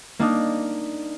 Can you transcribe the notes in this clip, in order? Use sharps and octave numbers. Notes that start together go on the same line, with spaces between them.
A#3 D4 D#4